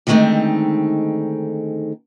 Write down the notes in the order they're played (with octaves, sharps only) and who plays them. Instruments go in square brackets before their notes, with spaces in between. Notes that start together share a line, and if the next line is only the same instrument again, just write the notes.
[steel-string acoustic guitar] D3 D#3 G#3 A3 C4 D#4